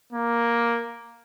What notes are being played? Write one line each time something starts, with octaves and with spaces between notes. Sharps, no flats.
A#3